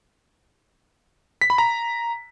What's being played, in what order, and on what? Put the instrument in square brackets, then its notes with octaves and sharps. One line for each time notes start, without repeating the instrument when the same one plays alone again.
[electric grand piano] B6
B5
A#5